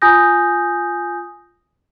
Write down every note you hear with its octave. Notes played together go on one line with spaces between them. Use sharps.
F4 G#5 D#6 G6 A#6